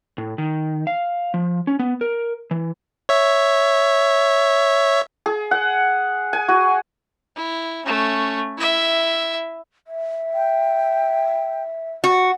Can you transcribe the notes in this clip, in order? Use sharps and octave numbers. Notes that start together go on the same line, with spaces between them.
A2
D#3
F5
F3
C#4
B3
A#4
E3
C#5 E5
G#4
F#5
G#5
F#4
E4
A3 C#4
E4 E5
E5
G5
F#4 F#5